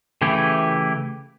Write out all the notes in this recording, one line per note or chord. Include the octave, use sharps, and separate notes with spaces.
C#3 E3 A3 E4 G4